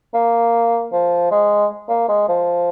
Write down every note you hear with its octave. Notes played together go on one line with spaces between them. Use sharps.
A#3
F3
G#3
A#3
G#3
F3